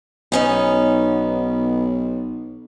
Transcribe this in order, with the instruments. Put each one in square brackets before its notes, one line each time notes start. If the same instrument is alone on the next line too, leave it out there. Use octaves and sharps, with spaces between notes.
[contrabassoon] B1 [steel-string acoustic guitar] B3 C#4 D#4